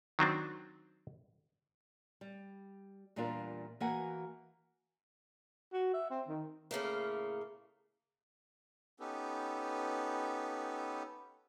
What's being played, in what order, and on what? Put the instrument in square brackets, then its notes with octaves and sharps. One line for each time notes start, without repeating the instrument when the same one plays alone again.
[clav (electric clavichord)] D#3 F#3 C4 D4
[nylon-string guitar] G3
E2 A#2 G3 D4 F4 A#4
E3 A#3 F#4 A#4 F#5 G#5
[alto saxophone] F#4
E5
C4
D#3
[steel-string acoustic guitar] A2 C#3 A3 A#3
[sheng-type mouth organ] B3 C#4 D#4 G4 A4 B4